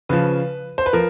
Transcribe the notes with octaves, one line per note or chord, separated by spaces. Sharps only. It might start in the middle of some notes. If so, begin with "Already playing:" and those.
C#3 F3 B4
C5
B4
F3 A#4